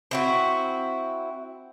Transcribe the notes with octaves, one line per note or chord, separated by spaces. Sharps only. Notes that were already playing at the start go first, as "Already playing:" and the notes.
C4 E4 F#4